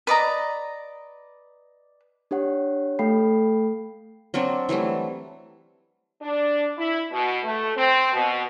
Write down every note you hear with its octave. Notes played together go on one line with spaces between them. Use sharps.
B4 D5 D#5 A#5
D4 G4 C#5 F#5
A3 A4 F5 G5 B5 C7
F#3 A#3 C4 D4
E3 F#3 G3 A3
D4
E4
B2
A3
C4
B2